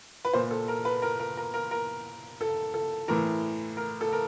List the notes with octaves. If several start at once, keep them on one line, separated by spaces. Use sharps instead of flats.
B4
A#2 C5
A4
A#4
B4
A#4
A#4
A#4
A#4
A#4
A4
A4
A2 E3 A#4
A#4
A4
A#4